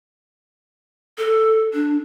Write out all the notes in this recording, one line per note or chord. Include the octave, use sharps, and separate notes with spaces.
A4
D4